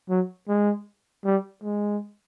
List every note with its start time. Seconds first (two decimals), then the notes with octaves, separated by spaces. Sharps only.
0.09 F#3
0.48 G#3
1.25 G3
1.63 G#3